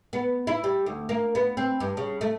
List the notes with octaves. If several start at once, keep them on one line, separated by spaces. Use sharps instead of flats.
B3
E4
G3
D2
A#3
B3
C4
G2
C#3
A3